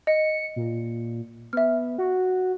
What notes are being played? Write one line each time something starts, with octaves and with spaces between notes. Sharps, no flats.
D#5 C#7
A#2
B3 E5 F6
F#4